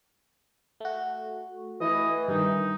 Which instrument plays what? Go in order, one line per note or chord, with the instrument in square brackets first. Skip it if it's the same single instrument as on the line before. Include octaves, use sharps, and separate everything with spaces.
[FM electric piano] A3 F#4
[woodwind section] E3 [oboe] D#5
[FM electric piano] G2 D#3 [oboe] D#4